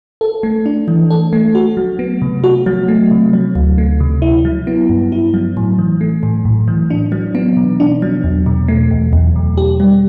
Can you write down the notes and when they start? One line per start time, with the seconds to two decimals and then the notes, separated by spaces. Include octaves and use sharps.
0.21 A4
0.43 A3
0.66 D4
0.88 E3
1.11 A4
1.33 A3
1.55 F#4
1.77 F#3
1.99 B3
2.22 C3
2.44 F#4
2.66 F#3
2.88 A3
3.11 C3
3.33 F#3
3.56 D2
3.78 A3
4.00 C3
4.22 E4
4.45 F#3
4.67 B3
4.89 G2
5.12 E4
5.34 F#3
5.57 A2
5.79 E3
6.01 A3
6.23 A2
6.45 A2
6.68 E3
6.90 D4
7.12 F#3
7.35 B3
7.57 B2
7.80 D4
8.02 F#3
8.24 E2
8.46 B2
8.68 A3
8.91 E2
9.13 E2
9.36 B2
9.58 G4
9.80 G3